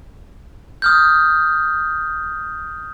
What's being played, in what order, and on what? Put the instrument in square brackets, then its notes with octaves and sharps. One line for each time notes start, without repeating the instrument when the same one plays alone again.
[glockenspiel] D#6 F6 G6